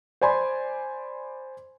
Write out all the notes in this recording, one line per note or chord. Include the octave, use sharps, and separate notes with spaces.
C5 D5 G#5 B5 C6